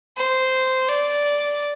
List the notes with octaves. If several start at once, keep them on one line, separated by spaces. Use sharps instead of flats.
C5
D5